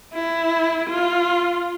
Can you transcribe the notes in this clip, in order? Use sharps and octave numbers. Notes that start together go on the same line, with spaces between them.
E4
F4